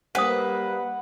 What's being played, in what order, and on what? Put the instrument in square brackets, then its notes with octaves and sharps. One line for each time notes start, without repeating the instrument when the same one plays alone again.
[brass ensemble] G3 A#3 [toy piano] D4 C5 D#6 [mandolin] B4 [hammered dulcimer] F#5